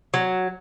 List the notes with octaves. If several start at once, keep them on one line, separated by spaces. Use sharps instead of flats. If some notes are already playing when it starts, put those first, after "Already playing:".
F#3